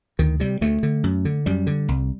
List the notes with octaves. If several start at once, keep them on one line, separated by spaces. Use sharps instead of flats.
D2 D#3
C3 G3
D2 A3
D3
F#2
D3
F#2 G3
D3
C2